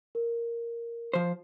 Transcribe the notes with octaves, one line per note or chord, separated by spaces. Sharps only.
A#4
F3 C5